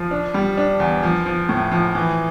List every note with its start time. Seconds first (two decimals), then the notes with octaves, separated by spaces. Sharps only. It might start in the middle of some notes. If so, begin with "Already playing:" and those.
Already playing: F3
0.11 D4
0.34 G3
0.57 D4
0.80 E2
1.03 F3
1.26 F3
1.49 A2
1.71 F3
1.95 E3